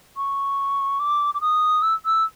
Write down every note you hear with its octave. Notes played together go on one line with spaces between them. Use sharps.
C#6
D6
D6
D#6
E6
E6